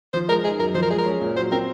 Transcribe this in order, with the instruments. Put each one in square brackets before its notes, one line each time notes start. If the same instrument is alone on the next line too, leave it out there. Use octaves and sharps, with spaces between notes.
[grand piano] F3 [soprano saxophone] C5
[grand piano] G#3 [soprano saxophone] A#4
[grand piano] D#4 [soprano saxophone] G#4
[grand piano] F#2 [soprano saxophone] A#4
[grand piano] F3 [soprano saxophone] C5
[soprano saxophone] A#4
[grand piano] G#3 [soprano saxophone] G#4
[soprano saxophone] A#4
[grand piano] C#4
A#2
[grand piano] F#3 [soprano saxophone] C5
[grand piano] C4 [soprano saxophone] A#4